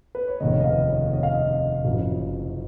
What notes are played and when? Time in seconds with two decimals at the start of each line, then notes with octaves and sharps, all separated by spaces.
0.15 B4
0.28 C#5
0.40 F1 D#2 C#3 D#5
0.60 D#5
0.64 F5
0.89 C#5
1.14 D#5
1.23 F5
1.34 D#5
1.85 F#1 F#2 C#3 F3